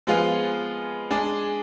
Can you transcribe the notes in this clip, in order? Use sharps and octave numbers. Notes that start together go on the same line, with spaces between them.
F3 G#3 B3 F4 G#4
G#3 D4 G#4